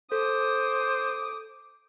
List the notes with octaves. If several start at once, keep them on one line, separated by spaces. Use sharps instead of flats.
A4 C5 D6 D#6